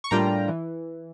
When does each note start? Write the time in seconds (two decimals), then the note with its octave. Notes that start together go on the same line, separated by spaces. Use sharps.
0.04 C#6
0.11 A2 G3 A#3 D4 F4 G5 A#5
0.48 E3